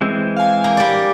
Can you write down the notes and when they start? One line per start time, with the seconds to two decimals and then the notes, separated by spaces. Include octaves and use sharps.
0.01 E3 G#3 C4
0.36 F5 G#5
0.64 A#3
0.77 G3 D5